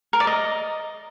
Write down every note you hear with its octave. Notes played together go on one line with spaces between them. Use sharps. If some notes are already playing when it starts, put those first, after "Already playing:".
A#4
D5
D#5